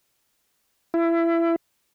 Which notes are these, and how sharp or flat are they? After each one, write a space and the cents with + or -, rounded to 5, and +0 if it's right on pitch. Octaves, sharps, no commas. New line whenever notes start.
E4 +25